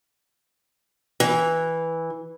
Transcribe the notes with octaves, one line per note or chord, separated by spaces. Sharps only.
E3